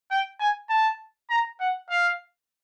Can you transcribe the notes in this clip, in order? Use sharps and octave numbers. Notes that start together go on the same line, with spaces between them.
G5
G#5
A5
A#5
F#5
F5